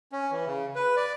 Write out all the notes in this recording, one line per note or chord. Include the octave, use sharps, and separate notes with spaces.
C#4
E3
C#3
B4
D5